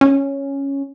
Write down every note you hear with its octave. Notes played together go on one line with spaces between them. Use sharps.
C#4